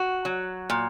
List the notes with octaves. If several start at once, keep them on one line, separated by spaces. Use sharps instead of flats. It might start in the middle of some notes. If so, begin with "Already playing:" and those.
Already playing: F#4
F#3
A#2